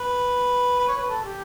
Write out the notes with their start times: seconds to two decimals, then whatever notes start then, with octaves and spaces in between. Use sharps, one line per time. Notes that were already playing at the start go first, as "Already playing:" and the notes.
Already playing: B4
0.79 B4
0.88 C#5
0.97 B4
1.09 A4
1.25 G4